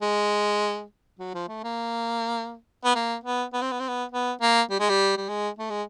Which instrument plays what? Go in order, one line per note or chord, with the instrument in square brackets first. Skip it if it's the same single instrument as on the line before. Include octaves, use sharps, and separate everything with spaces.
[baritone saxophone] G#3
F#3
F3
A3
A#3
B3
A#3
B3
B3
C4
B3
C4
B3
B3
A#3
G3
G#3
G3
G3
G#3
A3
G#3